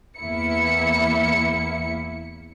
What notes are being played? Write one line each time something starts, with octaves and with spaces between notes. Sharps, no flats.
E2 A#3 E4 C#7